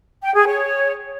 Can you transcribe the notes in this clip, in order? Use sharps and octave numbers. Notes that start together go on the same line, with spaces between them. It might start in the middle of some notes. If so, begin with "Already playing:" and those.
G5
G#4
C#5